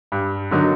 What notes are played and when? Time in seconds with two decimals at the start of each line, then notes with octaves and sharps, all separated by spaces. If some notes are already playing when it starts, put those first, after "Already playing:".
0.12 G2
0.51 D3 F#3 A#3 D#4